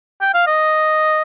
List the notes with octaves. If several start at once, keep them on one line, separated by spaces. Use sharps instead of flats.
G5
F5
D#5